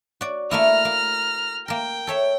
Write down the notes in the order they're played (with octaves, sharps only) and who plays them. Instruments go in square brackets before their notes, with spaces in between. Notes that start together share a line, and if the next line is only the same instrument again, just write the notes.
[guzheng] F#4 D5
[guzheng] A3 A#3 E4 [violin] A#5 F6
[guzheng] A#3
[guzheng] A#3 A#4 [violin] G5
[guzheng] A4 C#5 E5